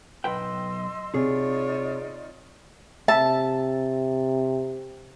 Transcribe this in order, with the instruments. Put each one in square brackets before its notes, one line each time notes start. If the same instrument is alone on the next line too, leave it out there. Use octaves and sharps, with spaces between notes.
[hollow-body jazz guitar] B1 B4 G5 [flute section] D#5 C6 E6
[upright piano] C3 [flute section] D#4 F4 D5 [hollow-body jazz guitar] G#4 [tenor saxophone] C#5
[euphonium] C3 [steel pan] E5 [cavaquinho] A5